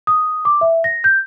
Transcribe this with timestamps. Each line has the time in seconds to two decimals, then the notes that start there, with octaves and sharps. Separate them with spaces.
0.07 D#6
0.45 D6
0.61 E5
0.84 A#6
1.04 G6